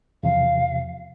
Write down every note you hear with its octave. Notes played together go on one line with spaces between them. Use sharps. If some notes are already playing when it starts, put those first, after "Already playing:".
E2 C3 F3 F5